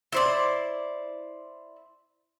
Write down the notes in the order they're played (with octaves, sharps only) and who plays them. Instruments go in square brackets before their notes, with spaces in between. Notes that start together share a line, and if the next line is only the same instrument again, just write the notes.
[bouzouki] E4 C5 D5